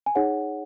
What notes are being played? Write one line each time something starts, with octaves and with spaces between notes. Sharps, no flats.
G#5
D#4 G#4 C#5 F#5